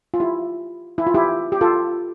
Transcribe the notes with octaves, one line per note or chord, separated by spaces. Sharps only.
F4
E4 G4
E4
F4
E4 G4
G4
F4 A4